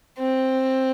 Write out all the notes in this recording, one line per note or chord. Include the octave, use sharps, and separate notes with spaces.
C4